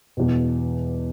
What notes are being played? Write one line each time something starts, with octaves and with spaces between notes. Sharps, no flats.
E1 E2 B2